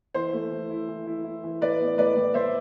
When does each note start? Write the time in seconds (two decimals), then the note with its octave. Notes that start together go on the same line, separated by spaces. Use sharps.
0.14 E3 C5
0.33 A3
0.52 E3
0.70 E4
0.88 E3
1.07 E4
1.24 E4
1.44 E3
1.61 A2 B4 D5
1.80 B3
1.98 A2 B4 D5
2.17 A2
2.34 A2 C5 E5